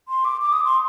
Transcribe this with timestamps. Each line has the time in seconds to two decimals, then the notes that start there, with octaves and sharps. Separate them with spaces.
0.08 C6
0.25 D6
0.41 D6
0.53 D#6
0.65 C6